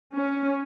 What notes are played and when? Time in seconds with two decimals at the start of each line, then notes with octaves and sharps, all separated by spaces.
0.14 C#4